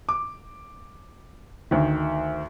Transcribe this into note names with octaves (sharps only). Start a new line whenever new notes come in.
D6
D2 D#3